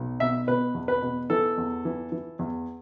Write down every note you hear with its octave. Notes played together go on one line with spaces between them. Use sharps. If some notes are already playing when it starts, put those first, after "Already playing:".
Already playing: B1
B2 E5
B2 B4
E2
B4
B2
E3 A4
E2
E3
E3
E2